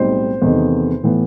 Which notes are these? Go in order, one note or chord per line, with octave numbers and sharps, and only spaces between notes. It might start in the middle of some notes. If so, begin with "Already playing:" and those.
Already playing: B1 A2 G3 C4 D#4 C5
E2 C3 D#3 A3 D#4
A2 E3 B3